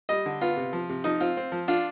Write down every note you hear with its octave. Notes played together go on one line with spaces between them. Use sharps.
G3 D#5
D3
B3 F4
C3
F3
C3
F3 D#4
C4 F4
C4
F3
D4 F4